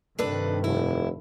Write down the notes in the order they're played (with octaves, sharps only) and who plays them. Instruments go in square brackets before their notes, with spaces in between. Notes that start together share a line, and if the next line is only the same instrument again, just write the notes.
[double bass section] G2 C3 D#3 [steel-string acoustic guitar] D4 A4 B4
[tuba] F1 [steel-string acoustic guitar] E4